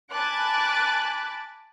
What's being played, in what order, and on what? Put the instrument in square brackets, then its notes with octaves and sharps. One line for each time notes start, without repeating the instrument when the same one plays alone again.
[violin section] G#5 A5 B5 D6 F#6 A6